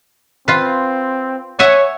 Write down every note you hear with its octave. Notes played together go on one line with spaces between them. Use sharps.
C4 F4 B4
C#5 E5 F#5 G#5